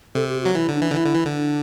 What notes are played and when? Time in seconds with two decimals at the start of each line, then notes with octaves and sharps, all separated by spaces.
0.15 C3 A4
0.29 G4
0.42 F#3 F#4
0.55 E3 E4
0.69 D3
0.75 D4
0.82 E3
0.91 D3
0.95 E3 E4
1.05 D3
1.15 E3
1.25 D3
1.35 D4